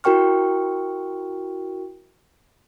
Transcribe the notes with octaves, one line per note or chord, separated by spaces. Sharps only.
E4 F#4 A#4 G5 C#6 F6